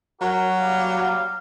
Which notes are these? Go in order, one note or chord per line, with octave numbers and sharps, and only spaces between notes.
F#3 F#4 A#4
G3 A#3 F5